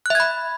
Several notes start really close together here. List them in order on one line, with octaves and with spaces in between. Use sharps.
F#6 E5 G#6 B5